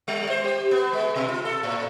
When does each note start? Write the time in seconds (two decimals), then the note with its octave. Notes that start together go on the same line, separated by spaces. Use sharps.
0.08 G3
0.30 C5
0.44 G4
0.71 B3
0.93 G#3
1.16 B2
1.28 F4
1.45 A4
1.63 A2